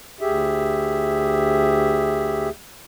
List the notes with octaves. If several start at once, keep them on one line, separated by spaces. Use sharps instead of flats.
D2 G4 G#4 E5